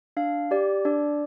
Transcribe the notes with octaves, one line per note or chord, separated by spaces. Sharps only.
D4 F5
G4 D5
D4 D5